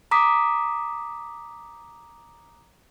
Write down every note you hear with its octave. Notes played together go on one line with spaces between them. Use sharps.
A#5 D6 D#6 B6